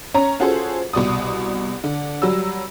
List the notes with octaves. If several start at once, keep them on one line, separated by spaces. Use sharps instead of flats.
C#4 C#5 A#5
C#4 F4 F#4 G#4 A4 C5
C2 B2 D5 D#6
D3
F#3 G3 E6